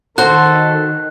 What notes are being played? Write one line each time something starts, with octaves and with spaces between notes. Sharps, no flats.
D#3 F#4 A4 C5 F#6